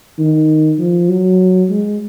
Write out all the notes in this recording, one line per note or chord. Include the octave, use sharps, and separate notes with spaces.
D#3
F3
F#3
G#3